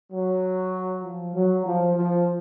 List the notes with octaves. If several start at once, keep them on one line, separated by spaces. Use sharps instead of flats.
F#3
F3
F#3
F3
F3